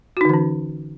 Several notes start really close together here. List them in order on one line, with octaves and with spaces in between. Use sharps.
F#4 D#4 D3 E3 C#4